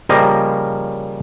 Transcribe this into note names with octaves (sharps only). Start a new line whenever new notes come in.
C#3 F3 G3 A#3 D#5 A#5